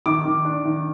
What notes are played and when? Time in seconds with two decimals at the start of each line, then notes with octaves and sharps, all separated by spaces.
0.06 D#3 D6
0.25 D#3
0.45 D4
0.65 D#3